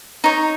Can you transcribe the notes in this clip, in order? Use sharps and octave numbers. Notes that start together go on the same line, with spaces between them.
D#4 C#5